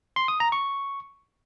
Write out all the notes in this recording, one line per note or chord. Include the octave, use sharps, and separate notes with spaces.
C6
D#6
A#5
C#6